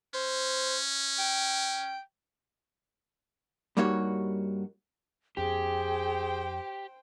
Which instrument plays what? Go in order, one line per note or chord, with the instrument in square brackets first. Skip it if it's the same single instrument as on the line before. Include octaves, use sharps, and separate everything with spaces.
[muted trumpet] C#4 [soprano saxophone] C5
[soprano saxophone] G5
[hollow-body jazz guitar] G2 G3 A#3 D#4 F#4 C#5
[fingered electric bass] F2 B3 C#4 [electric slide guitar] G4 [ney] G#4 [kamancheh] C5 G5